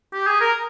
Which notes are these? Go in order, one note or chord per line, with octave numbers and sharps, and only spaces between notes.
G4
G#4
A#4